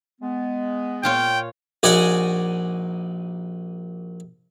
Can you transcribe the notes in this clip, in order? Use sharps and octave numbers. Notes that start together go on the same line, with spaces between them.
G#3 B3
A#2 F4 C#5 G5
A#1 D#4 F#4 D5 D#5 G#5